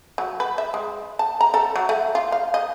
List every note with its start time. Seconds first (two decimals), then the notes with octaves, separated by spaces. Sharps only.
0.18 F#3
0.40 B4
0.58 E5
0.74 G#3
1.19 A5
1.41 A#5
1.54 A4
1.76 F#3
1.89 A3
2.15 F4
2.32 F5
2.54 D#5